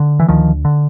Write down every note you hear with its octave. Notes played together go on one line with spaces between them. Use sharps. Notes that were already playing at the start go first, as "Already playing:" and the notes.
Already playing: D3
E3
D2 D#3 F3
D3